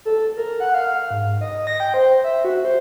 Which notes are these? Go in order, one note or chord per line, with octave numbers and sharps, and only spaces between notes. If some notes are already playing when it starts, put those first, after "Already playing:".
A4
A#4
F#5
F5
G#2
D#5
A#6
G5
C5
E5
F#4
C5